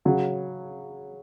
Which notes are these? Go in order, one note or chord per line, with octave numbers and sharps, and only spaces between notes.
C#3 F#3